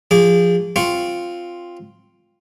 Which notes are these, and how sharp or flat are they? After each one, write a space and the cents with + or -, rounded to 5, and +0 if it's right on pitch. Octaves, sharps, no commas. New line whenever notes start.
F3 +0 G#4 -30 D6 -25
C4 +0 F4 +0 C#6 +0